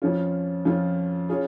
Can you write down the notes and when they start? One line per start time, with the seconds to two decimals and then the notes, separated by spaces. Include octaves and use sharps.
0.02 F2 F3 C#4 F4
0.65 F2 F3 C#4 F4
1.29 C#4 F4 G#4